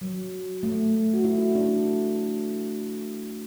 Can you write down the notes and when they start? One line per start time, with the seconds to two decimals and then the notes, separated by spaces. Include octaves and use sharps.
0.01 F#3
0.63 A3
1.14 F#4
1.24 E4
1.55 D4